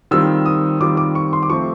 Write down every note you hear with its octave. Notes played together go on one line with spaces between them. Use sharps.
D#3 G3 C4 F4 E6
D#6
D#3 G3 C4 F4 D6
D6
C#6
C6
D6
F3 A3 C4 C#6